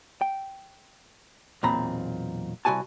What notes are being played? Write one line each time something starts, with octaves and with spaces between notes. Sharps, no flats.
G5
B1 E2 A#2 C4 A#5 B5
C2 A3 F#4 G#5 A5